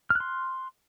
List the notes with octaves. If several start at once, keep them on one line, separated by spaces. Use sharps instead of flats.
C6 F6 F#6